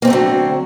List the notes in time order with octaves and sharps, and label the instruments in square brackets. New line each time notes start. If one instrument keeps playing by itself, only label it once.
[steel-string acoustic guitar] A#3
C4
A3
D3
F#3